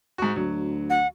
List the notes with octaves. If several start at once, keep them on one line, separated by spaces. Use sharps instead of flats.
G#2 F#4
D2 F#3
F#5